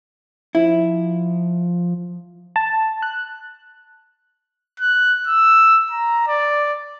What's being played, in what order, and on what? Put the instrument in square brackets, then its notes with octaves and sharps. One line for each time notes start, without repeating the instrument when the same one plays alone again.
[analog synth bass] F3 [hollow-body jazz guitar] E4
[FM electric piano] A5
F#6
[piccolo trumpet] F#6
E6
A#5
D5